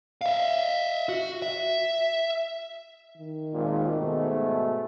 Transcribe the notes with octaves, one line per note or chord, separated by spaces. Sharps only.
E5 F5
F#4
E5
D#3
G#1 A#2
G#2 B2 A3